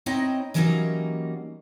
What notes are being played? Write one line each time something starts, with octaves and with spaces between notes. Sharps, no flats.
C4 D#4 E4 C#5 D#5 G5
E3 F#3 G3 A#3 C#4 D#4